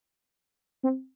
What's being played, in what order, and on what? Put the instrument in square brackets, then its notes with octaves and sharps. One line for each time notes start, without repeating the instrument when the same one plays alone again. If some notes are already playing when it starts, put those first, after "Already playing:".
[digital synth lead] C4